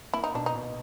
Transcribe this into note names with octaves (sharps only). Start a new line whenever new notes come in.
A#3 E4
D#4
B2 D4
D#4
B2